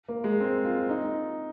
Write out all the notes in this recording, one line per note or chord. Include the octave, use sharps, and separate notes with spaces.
A#3
G#3
C4
F4
D#4